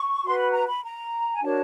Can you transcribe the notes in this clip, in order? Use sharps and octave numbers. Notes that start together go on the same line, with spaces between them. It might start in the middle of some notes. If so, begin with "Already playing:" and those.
Already playing: C#6
F#4 B4 C6
B5
A#5
B5
A#5
G#5
D4 F#4 A#4 C#5 A5